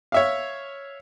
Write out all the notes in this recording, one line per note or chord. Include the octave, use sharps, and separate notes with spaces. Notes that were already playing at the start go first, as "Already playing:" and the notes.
C#5 E5 F5